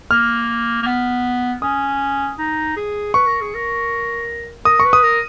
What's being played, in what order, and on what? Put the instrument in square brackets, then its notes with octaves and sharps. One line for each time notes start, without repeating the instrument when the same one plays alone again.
[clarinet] A#3 [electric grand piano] F6
[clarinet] A#3
B3
[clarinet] C#4 [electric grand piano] D#6
[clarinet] D#4
G#4
[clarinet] B4 [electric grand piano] C#6
[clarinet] A#4
G#4
A#4
[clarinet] A#4 [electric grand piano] D#6
[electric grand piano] C#6
[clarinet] B4
[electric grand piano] D#6
[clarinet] A#4